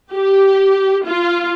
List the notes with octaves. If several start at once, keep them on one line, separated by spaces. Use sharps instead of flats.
G4
F4